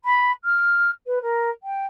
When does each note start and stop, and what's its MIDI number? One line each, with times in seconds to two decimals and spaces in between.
0.04 0.31 83
0.44 0.90 89
1.06 1.18 71
1.21 1.50 70
1.63 1.86 79